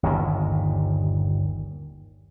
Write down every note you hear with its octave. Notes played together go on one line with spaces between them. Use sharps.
G1 D#2 A#2 D#3